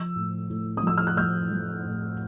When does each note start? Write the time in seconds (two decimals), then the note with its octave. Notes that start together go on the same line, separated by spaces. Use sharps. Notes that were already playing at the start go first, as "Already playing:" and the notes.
Already playing: F3 E6
0.15 A2
0.50 A2
0.77 D#6
0.83 F3 E6
0.98 F6
1.07 F#6
1.17 F3 F6 G6
1.51 F3
1.85 A2